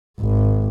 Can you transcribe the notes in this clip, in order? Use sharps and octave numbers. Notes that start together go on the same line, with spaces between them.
G#1